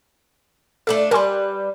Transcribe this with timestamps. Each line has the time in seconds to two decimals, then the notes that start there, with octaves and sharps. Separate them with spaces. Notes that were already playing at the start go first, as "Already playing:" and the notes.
0.87 A3 D4 F4 A4
1.11 G3 A#4 B4 G#5 C6